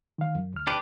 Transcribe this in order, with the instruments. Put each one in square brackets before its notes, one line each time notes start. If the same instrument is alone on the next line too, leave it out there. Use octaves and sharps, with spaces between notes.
[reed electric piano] D#3 F5
F#2
D2 F6
[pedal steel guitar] D4 G4 B4